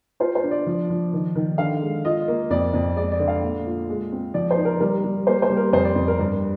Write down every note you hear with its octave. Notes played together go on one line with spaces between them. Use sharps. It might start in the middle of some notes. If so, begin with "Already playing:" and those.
F4 C5
C5
D4
D5
F3
F3
D#3
D#3
D3 F5
G#3
F4 D#5
A#3
F2 D5
F2
G#3 D5
D5
D3
F5
A#2
F4
G#3
C4
F3 D5
C5
D#4
A#4
G3 A#4
G3
A#3 C5
C5
G3
A#4
F2 C5
D5
F2
A#4
G2